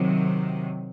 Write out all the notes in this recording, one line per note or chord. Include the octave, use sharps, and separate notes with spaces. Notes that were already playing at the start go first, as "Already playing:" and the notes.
Already playing: C3 D#3 F#3